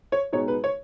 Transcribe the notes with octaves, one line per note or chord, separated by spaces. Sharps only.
C#5
B2 G#3 D#4 C#5
B4
C#5